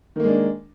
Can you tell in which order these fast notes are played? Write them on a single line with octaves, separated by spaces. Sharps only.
D#3 A#3 G#3 D4